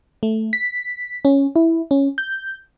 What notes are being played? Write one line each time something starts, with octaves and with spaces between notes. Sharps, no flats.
A3
B6
C#4
E4
C#4
G6